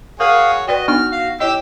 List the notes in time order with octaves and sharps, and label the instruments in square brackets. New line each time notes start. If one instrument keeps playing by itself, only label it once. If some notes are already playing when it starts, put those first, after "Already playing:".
[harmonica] F#4 G#4 C#5 [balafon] A#4 [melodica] F5 D#6
[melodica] F#4 [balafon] B4 D5 G5 [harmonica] D#5
[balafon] B3 D4 D#4 [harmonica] F6
[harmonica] F5
[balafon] E4 C#5 D#5 [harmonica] G4 E6